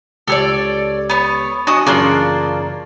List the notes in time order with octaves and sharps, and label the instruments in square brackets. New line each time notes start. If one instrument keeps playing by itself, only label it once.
[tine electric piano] C#2 G4 C#7 [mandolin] A4 C#5 D5
[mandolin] B3 C#5
[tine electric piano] D4 G#5 C#6 [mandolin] F#4 D#5 D#6
[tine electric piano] A1 F#2 C#3 [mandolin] A#3 D4 F4